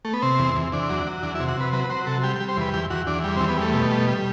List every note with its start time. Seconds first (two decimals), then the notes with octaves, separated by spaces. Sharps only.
0.05 A3
0.13 B3
0.22 C3 C4
0.39 E2
0.56 E2
0.72 E2 D4
0.89 F#3
1.07 F#3
1.23 E2 D4
1.35 E4
1.39 C3
1.48 F#4
1.57 C3 B4
1.73 F#3 B4
1.84 B4
1.90 F#3 C5
2.06 C3 A4
2.23 G3 G4
2.36 G4
2.40 G3
2.48 C5
2.57 E2 B4
2.73 E2 G4
2.90 E2 F#4
3.07 E2 D4
3.24 G3
3.37 C4
3.40 E2
3.49 B3
3.57 G3 A3
3.74 B2
3.91 G3
4.07 G3